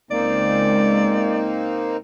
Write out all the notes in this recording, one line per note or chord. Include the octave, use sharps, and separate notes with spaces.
C#2 A#3 C4 D#4 D5